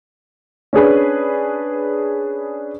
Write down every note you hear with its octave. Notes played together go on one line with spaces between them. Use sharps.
C#4 D4 G#4 B4